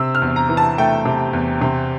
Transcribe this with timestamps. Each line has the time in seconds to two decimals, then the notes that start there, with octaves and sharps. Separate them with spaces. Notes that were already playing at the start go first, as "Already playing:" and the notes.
Already playing: C3 E6
0.15 F6
0.22 E2
0.36 A#5
0.49 E3
0.57 A5
0.78 A3 G5
1.05 C3
1.33 E2
1.61 C3